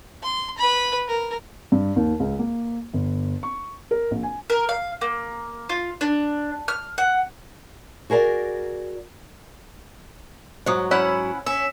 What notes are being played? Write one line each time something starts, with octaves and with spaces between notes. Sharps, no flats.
C6
B4 B5
A#4
G2
D#2
C#2
A#3
G1
C#6
A#4
A#1
G#5
A#4
F5
A#3
F4
D4
F6
F#5
F#4 G#4 A#4 D5
G#2 F#3 C5 D#6
C#4 E4 C#5 F#5
C#4 E5